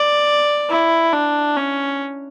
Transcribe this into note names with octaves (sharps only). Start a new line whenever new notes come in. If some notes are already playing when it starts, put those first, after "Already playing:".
Already playing: D5
E4
D4
C#4